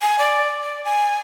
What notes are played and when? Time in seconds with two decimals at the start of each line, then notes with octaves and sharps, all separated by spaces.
0.02 G#5
0.19 D5
0.63 D5
0.85 G#5